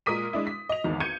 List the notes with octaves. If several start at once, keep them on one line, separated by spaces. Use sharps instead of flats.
A#2 G#3 A#4 D#6 B6 D#7
G#3 D4 E4
B6
D#5 F7
G#1 E2 G#2
G6 G#6 C#7 D#7